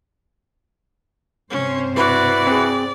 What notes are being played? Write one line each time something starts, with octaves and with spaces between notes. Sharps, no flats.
G2 C3 C#4 C5
E4 F#4 B4 D5
C4 G#4